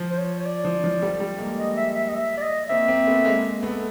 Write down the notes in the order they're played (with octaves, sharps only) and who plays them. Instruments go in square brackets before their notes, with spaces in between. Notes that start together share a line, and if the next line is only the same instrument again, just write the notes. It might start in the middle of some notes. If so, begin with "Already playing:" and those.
Already playing: [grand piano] F3
[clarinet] C5
C#5
C#5
D5
[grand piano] F3
F3
G3 A3
G3 A3
G#3 A#3
[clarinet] D#5
E5
E5
D#5
E5
D5
D#5
[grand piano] A#3 C4 [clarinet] E5
[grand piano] A#3 C4
A3 B3
G#3 A#3
A3 B3